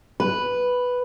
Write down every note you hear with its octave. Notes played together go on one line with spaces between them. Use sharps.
B4